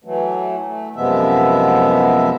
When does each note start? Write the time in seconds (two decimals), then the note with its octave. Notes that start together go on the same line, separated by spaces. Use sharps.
0.04 E3 F#3 A3
0.65 A3
0.96 F#2 C3 F3 G#3 B3 E5